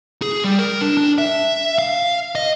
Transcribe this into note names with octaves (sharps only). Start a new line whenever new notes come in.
G#4
G3
A#4
D4
D4
E5
F5
D#5